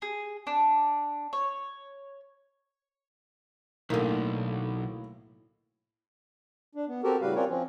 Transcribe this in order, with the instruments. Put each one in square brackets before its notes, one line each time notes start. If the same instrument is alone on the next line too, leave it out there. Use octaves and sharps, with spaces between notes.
[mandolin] G#4
D4
C#5
[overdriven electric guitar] B1 [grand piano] A2 A#3 [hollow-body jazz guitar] D3 D#3
[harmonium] D4
B3
C4 F#4 G4 A4 A#4
A2 C#3 G3 F#4 B4 F5
C4 C#4 F4 A#4 C#5 D5
F3 C4 C#4